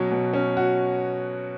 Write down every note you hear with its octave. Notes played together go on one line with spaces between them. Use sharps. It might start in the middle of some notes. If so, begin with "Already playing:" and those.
Already playing: B2 F#3 C#4 F#4
B2
C#4
F#4